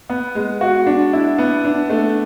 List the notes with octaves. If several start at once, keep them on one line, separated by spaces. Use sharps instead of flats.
B3
G#3
F#4
D4
E4
B3
D4
A3